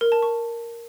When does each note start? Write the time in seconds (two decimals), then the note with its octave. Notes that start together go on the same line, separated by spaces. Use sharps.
0.01 A#4
0.12 A5
0.23 C#6